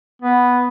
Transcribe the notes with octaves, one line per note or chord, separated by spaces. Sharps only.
B3